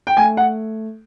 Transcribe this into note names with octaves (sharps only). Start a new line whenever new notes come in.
G5
A3 G#5
F#5